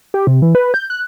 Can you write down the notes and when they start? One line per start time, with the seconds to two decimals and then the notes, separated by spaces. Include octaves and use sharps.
0.14 G4
0.27 C3
0.42 E3
0.55 B4
0.74 G6
0.90 F#6